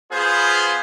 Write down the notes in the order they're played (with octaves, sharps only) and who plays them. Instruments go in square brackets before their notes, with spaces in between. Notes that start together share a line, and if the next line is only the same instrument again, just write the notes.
[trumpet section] B3 F4 G#4 B4 C5